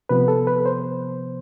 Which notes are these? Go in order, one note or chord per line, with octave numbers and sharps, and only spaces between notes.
C3 F3 B3 B4
A4
B4
C5